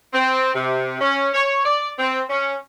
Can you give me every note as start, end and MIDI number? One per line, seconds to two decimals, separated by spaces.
0.13 0.50 60
0.55 0.98 48
1.01 1.28 61
1.34 1.64 73
1.65 1.90 74
1.99 2.22 60
2.29 2.55 61